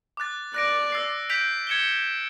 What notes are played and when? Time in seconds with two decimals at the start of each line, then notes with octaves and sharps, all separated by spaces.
0.17 D6 F#6 A6
0.54 D5 F#6 A#6 D7
0.92 E6 A6 C7
1.30 G6 B6 D7 F7
1.67 G#6 C#7 E7 G7